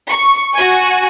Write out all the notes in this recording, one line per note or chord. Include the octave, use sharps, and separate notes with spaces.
C#6
F#4 G#5